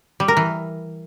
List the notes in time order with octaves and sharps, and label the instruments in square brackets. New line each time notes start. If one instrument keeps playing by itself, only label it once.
[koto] G3
A#4
E3